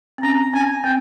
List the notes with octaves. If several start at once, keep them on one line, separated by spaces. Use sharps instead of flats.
C4
C#4 A#5
C#4 G#5
C4 G5